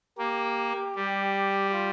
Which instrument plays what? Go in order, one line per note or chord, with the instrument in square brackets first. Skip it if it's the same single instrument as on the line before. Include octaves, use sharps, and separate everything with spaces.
[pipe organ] A#3 [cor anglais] G4
[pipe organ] G3
[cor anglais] G4
F4